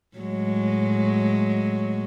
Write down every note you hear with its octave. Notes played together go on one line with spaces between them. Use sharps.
A2 F#3 G#3